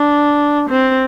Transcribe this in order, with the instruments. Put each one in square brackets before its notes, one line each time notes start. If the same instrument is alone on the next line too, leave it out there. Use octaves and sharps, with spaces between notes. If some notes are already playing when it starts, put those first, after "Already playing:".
Already playing: [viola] D4
C4